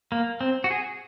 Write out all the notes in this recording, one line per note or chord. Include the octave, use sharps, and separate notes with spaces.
A#3
C4
F#4
G#4